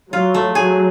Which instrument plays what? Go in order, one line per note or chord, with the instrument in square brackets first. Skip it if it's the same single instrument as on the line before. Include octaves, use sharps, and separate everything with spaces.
[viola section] F#3 [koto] F4
[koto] A3
[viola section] F#3 [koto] G#4